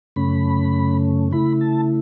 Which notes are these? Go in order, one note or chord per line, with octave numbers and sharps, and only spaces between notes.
F#2 C#3 A3 C#4 B5
C#3 A3 E4 B5
A5